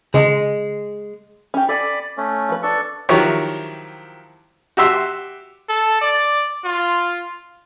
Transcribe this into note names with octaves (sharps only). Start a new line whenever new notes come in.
C#3 G#3
C#4 G4
A4 D5 G#5 B5
A3 C#4
F3 B4
D4 A4 C#6
D#3 F3 F#3 E4 G4 C#5
F#4 G4 E5 C6 E6
A4
D5
F4